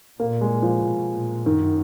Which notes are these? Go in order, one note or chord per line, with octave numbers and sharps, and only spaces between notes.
A#2 A#3
G#3
F3
B2
A#2
F#2 D#3